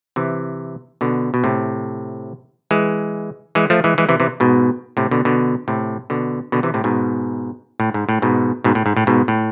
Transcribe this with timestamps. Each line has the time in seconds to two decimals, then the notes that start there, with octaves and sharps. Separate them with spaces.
0.16 C3 E3
1.01 B2 D3
1.34 B2
1.44 A2 C3
2.71 E3 G#3
3.55 E3 G#3
3.70 F3 A3
3.84 E3 G#3
3.98 E3 G#3
4.09 C3 E3
4.20 C3 E3
4.40 G#2 B2
4.97 A2 C3
5.11 B2 D3
5.25 B2 D3
5.68 A2 C3
6.10 B2 D3
6.52 B2 D3
6.63 C3 E3
6.74 A2 C3
6.84 G#2 B2
7.80 A2
7.94 G#2
8.09 A2
8.22 G#2 B2
8.64 G#2 B2
8.75 A2
8.86 G#2
8.97 A2
9.07 G#2 B2
9.28 A2